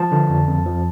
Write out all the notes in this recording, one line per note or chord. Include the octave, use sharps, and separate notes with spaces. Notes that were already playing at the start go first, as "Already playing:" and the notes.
Already playing: F3 A5
D3
F2
F2
F3